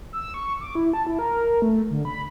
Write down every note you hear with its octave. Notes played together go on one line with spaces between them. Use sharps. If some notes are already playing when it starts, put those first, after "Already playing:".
E6
C#6
D6
E4
A5
E4
A#4
A3
D3
B5